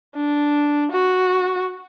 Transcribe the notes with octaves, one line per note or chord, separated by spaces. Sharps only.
D4
F#4